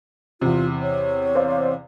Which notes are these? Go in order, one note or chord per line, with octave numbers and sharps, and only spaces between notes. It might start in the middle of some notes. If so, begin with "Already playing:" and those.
E2 C3 F4
C#5
C5 D5 F5